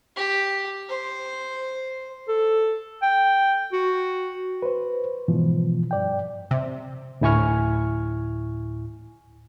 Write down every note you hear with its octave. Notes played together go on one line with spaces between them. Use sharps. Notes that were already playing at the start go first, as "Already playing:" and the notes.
G4
C5
A4
G5
F#4
B4 C5
G#2 B2 E3 F3
G2 D5 G5
C3
D2 A2 E4 G#5 C#6 F6